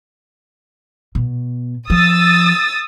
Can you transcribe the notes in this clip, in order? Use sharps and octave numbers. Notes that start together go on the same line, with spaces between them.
B2
F3 D#6 E6 A6